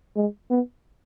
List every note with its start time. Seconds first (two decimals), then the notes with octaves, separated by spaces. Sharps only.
0.16 G#3
0.50 B3